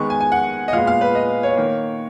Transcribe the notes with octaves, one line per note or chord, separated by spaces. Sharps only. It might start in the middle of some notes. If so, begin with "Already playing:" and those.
Already playing: D#3 G#3 B3 C#6
G#5
G#5
F#5
D#5
A#2 G#3 B3 F5
F5
B4
D#5
C#5
D#3 A#3